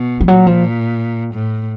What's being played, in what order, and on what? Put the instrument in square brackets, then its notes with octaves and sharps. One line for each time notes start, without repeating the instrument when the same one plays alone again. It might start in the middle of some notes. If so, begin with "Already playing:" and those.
Already playing: [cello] B2
[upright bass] F3
[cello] A#2 [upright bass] F#3
[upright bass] F3
[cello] A2